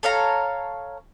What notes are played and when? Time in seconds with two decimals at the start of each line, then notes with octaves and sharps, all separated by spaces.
0.03 A4 C#5 F5 A#5